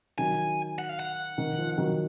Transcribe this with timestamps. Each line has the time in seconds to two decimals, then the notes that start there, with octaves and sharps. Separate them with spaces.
0.18 D#3 F#3 G#5
0.79 F#5
0.89 F5
1.00 F#5
1.38 D#3
1.58 F3
1.77 D#3 F#3